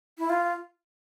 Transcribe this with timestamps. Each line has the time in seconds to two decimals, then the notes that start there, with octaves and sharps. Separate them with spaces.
0.18 E4
0.30 F4